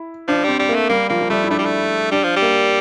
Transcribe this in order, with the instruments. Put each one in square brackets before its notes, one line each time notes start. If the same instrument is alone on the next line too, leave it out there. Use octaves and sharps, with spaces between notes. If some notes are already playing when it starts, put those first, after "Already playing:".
Already playing: [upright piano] E4
[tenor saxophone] F3 [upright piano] D4
[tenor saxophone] G3 [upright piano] C4
[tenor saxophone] G3
[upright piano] A#3
[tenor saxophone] A3
[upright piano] G3 [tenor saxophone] A#3
[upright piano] F3 [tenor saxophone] A#3
[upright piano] F3
[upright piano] G3 [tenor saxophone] A3
[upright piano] E4
[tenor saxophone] A3 [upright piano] D4
[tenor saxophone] G3
A3
[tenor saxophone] G3 [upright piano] D4
[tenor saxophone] F3
G3
[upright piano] A#3